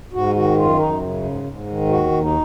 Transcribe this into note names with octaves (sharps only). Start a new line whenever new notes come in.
G#2 F#4
D#3 F#4
F#2 F4
F#2 D#4
C#3
G#2
G#2
D#3
D#2 F#4
D#2
D#4